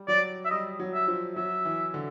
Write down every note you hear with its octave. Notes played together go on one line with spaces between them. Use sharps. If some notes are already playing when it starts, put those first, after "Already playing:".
Already playing: G3
F#3 D5
E5
G3 D#5
F#3
E5
F3
F#3 E5
E3
D3